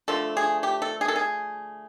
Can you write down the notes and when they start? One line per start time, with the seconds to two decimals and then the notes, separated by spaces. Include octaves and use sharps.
0.08 D3 F3 A3 A4
0.37 G#4
0.63 G4
0.82 A4
1.01 G#4
1.08 A4
1.16 G#4